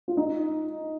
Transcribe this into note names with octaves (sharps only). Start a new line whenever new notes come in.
F4
D#4